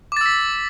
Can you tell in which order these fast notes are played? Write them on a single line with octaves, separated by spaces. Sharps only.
D6 A6 E6 B6